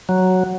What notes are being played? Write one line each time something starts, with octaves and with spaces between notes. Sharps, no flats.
F#3